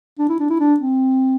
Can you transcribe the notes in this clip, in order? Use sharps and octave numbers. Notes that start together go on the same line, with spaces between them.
D4
E4
D4
E4
D4
C4